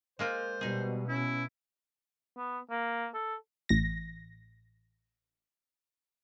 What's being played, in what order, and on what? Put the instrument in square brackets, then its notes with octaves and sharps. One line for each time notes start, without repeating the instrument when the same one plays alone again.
[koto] G#3 A#3 F4 [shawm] C5
[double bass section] B2 [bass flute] G3 [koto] D#4 G#4
[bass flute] C#4 [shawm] E4
[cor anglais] B3
A#3
A4
[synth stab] A1 A#6